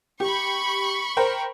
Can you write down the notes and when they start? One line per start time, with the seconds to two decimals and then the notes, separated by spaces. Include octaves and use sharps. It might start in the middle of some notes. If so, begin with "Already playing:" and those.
0.20 G4 B5 C#6
1.17 A#4 C5 G5